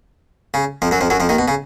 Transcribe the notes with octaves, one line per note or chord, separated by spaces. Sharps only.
C#3
F2 F3
F#2 F#3
F2 F3
F#2 F#3
F2 F3
D#2 D#3
B2
C#3